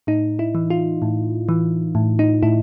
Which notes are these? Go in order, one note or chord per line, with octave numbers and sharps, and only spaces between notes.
A2 D#4
E4
E3
F4
A2
E3
A2
D#4
A2 E4